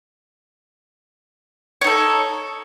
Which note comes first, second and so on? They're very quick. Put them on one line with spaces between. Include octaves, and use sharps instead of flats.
C#5 D#4 A4